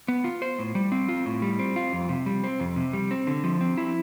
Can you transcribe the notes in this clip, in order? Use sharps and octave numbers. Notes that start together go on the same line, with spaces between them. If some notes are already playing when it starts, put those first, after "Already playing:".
B3
F4
C5
A2
G3
C4
F4
A2
G3
C4
F4
F2
C3
G3
C4
F2
C3
G3
C4
D3
F3
C4
E4